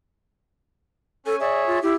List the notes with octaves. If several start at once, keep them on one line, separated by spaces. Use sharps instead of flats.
C#4 A4 G#5
G#4 C#5 D5 E5
F4
E4 G4